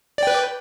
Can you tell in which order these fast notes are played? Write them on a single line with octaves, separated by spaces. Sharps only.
D5 G5 B4